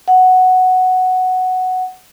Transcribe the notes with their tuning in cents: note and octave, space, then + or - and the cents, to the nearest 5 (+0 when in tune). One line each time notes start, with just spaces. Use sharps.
F#5 +0